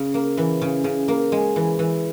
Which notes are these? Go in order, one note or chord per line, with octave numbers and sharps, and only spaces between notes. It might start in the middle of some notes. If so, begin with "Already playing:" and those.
Already playing: C#3
A#3
E3
C#3
C#3
A#3
G#3
E3
E3